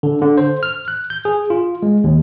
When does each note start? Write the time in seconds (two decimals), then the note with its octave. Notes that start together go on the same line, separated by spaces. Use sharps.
0.03 D3
0.22 D3
0.38 C5
0.63 F6
0.88 F#6
1.10 G6
1.25 G#4
1.50 F4
1.82 G#3
2.04 D#2